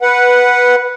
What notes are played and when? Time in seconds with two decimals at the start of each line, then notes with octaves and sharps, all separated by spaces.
0.02 B4 F#5